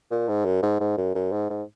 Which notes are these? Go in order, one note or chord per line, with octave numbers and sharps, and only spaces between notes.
A#2
G#2
F#2
G#2
G#2
F#2
F#2
G#2
G#2